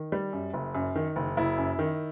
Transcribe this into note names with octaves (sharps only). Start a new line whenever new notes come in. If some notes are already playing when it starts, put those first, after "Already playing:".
Already playing: D#3
G3
F#2
F#1
F#2
D#3
F#1
F#1 E4
F#2
D#3